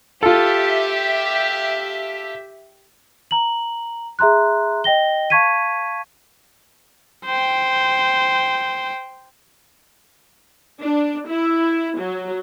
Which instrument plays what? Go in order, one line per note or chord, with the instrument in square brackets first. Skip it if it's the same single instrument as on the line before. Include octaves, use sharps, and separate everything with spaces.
[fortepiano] F4 A4 [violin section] G4 E5
[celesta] A#5 F#7
G#4 E5 A#5 C6 F#6
D#5 G5 A#6 G7
F5 A5 C#6 G#6 B6 D#7
[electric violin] C5 G5
[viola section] D4
E4
F#3